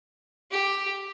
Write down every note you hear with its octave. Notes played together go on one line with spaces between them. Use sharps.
G4